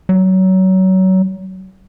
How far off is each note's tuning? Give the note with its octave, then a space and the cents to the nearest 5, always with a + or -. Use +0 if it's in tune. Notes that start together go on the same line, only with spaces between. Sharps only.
F#3 +25